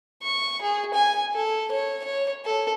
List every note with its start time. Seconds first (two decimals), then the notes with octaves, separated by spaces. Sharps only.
0.23 C#6
0.62 G#4
0.94 G#5
1.35 A4
1.71 C#5
2.04 C#5
2.45 A4